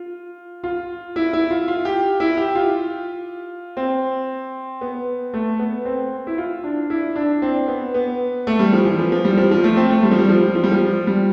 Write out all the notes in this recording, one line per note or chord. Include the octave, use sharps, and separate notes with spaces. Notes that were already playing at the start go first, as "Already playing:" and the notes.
Already playing: F4
F4
E4
E4
F4
F4
G4
E4
G4
F4
C4
B3
A3
B3
C4
E4
F4
D4
E4
D4
C4
B3
B3
A3
G3
F3
E3
F3
F3
G3
F3
F3
A3
C4
A3
G3
F3
G3
F3
F3
G3
F3
G3